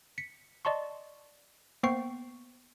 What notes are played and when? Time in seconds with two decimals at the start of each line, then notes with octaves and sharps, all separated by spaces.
0.18 B6 C#7
0.65 D5 D#5 A5 C6 C#6
1.83 A#3 B3 C5 G5 C#6 C7